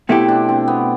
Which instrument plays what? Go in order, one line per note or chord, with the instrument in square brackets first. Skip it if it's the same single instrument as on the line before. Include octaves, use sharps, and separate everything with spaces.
[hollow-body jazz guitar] B2 A3 E4 G4 [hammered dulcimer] C4
[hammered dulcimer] D4
C4
B3